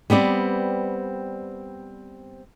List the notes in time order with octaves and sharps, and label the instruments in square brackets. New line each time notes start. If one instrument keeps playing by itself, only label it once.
[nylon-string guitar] G3 B3 C4 D5